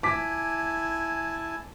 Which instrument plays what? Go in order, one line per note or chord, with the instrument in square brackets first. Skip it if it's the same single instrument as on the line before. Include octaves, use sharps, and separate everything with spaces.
[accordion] E4 G#5 A5 [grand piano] D6 B6